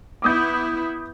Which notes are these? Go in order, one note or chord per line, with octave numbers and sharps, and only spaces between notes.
B3 E4 D6 D#6 G6